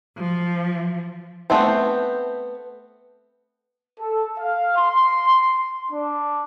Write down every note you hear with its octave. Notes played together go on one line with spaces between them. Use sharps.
F3
A3 B3 C4 C5
A4
F5
C6
D4